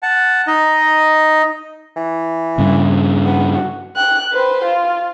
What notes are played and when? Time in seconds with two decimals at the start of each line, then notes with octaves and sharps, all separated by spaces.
0.03 F#5 A5
0.47 D#4 D#5
1.96 E3
2.58 G2 C#3
3.25 B3
3.55 F#4
3.96 G5 F#6
4.33 B4 C5
4.65 F4